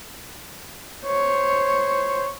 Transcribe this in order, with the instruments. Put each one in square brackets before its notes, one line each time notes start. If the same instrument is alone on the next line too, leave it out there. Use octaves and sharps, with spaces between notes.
[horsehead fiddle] C5 C#5